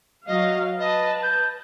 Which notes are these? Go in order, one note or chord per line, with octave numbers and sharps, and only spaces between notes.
F#3 D#5 F5
B4 D#5 A5
G6